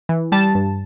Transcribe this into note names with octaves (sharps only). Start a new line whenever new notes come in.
E3
G3 A5
G2